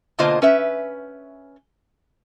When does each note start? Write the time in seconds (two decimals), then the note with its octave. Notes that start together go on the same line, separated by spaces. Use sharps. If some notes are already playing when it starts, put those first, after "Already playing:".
0.19 B2 D3 A#3 F4 C5 D#5
0.42 C#4 B4 E5